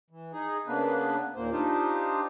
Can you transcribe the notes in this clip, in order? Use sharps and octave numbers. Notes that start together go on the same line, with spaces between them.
E3
D#4 G#4
C#3 A#3 B3 D4 B4
D#2 A#2 A#3 C5
D4 D#4 F4 G4 C5